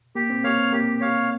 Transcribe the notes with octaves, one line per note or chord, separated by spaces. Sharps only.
A#3 G4
C4
A#3 C#5 F5
C4
A#3 G4
C#5 F5